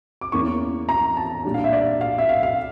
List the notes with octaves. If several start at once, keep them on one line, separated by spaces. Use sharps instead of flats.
D6
E2 E3 A#3 C#4 C#6
A#5
A5
A#2 G3 D4
F5
E5
D5
F5
E5
F5
F5